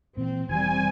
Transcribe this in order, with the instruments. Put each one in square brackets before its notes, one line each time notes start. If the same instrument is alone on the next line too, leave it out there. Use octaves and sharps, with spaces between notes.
[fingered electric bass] A#2 E3 [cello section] C4
[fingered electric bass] E1 D#3 E3 [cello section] G3 C4 [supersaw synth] G#5